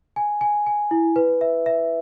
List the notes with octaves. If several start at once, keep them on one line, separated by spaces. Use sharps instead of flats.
G#5
G#5
G#5
E4
B4
E5
E5